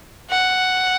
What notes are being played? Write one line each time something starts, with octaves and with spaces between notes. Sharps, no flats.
F#5